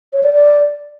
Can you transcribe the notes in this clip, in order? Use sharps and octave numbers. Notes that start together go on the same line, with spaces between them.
C#5
D5
D5